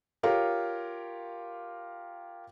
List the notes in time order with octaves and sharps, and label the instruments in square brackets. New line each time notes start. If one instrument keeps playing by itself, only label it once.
[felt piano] F4 G4 A#4 C#5 F5